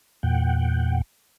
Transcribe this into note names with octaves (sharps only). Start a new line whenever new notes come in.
E2 A#2 F#5 G5